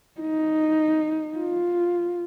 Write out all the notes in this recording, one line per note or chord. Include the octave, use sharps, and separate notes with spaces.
D#4
F4